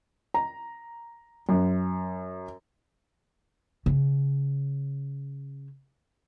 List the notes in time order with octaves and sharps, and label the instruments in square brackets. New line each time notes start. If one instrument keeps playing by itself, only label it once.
[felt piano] A#5
F#2
[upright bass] C#3 C#4